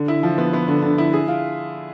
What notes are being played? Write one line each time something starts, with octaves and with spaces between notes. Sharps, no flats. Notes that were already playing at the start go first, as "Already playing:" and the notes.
Already playing: D3
E4
F3
B3
B3
D3
D3
E4
G#4
F4